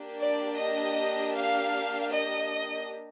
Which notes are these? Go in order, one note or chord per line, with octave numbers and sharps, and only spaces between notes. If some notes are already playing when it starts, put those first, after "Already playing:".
Already playing: A#3 D4 G4
D5
D#5
F5
D#5